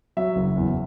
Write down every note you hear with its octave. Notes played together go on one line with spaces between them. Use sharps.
F#3 E5
F#1
E2